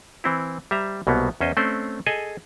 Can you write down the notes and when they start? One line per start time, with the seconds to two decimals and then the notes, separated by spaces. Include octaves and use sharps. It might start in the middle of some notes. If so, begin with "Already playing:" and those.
0.24 E3 C4 E4
0.71 G3 C5 E5 A#5
1.07 C2 B2 F#3 A#3 B3
1.41 E2 C#4 C5 D#5
1.57 A3 C4 C#4 C5 D5
2.06 G#4 A4 D#5 G#5